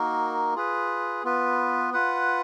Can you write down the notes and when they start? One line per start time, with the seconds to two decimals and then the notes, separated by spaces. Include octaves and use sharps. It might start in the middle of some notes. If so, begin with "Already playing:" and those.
Already playing: A#3 D#4 F#4 A#4
0.55 F4 G#4 B4
1.24 B3 F4 B4
1.93 F4 B4 F#5